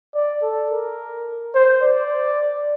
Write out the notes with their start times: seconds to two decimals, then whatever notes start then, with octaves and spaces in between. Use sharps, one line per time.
0.14 D5
0.42 A4
0.71 A#4
1.55 C5
1.83 D5